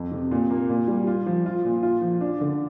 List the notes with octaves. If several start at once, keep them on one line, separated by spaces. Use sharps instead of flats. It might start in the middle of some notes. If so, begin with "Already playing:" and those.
Already playing: F2
C3
A#2
A#3
A#2
G3
F4
F3
F4
A#2
F4
F3
D4
D3